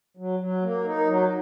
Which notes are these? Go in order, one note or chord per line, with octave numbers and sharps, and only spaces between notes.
F#3
F#3
A#3
D#4
F#3